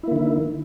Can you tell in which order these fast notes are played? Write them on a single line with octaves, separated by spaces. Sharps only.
E4 A#3 D3 D#3